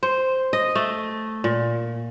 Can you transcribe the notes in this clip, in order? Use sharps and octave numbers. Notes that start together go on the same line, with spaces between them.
C5
D#5
A3
A#2